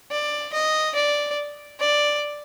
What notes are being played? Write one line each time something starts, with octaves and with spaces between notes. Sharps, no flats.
D5
D#5
D5
D5